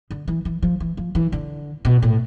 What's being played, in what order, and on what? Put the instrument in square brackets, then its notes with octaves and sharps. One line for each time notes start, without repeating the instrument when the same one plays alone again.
[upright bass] D3
E3
E3
F3
E3
F3
E3
D3
B2
A2